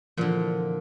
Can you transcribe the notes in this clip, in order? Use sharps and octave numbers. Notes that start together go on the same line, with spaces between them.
A#2 D3 E3 F3 A4